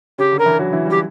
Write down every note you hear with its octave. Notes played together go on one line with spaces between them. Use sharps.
C#3 C#4 G4
D3 D4
A#4
E3 E4
F#3 F#4
E3 E4
G3 G4